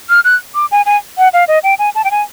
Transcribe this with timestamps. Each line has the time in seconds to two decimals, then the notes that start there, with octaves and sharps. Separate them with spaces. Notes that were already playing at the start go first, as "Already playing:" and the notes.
0.09 F6
0.25 F#6
0.55 D6
0.71 G#5
0.86 G#5
1.18 F#5
1.33 F5
1.48 D#5
1.64 G5
1.79 G#5
1.95 A5
2.04 G5
2.11 G#5